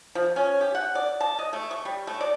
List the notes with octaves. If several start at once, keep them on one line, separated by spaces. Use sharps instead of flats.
F3
C#4
G4
F#5
D5
A5
D#5
A3
C#6
G3
A3
D5